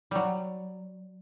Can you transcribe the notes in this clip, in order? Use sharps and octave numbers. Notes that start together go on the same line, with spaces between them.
F#3 G3